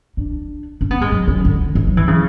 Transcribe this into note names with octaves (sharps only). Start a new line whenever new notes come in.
D4
C#4
B3
G#3
F#3
C#4
D3
E3
F#3
E3
C#3